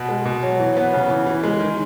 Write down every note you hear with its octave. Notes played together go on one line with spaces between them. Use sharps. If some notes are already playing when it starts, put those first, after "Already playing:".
Already playing: B2
G#3
B2
F#3
E3
B3
C#3
E3
E3
G#3
D#3